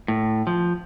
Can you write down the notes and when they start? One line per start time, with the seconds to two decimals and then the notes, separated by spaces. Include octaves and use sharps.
0.08 A2
0.47 F3